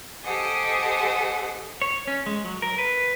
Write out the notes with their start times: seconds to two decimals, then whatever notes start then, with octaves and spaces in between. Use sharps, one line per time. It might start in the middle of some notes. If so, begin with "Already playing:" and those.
0.24 G4 A4 C5 D#5 F#5 G#5
1.82 C#5
2.07 C#4
2.26 G#3
2.45 F#3
2.62 A#4
2.78 B4